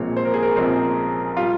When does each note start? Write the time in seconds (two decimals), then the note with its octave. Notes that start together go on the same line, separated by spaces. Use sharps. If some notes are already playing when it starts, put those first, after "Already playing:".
Already playing: A#1 A#2 G#3 C4 C#5
0.17 C5
0.25 A#4
0.34 G#4
0.43 A#4
0.56 A#1 A#2 G#3 C4 G#4
1.37 G3 F4